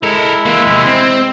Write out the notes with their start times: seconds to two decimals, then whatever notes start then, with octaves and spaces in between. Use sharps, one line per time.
0.03 G#3 E4 A4 A#4
0.45 E3 A#3
0.67 E2 C3
0.87 C4